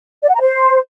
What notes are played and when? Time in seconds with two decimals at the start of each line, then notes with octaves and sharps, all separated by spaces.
0.23 D5
0.29 F#5
0.35 A#5
0.41 C5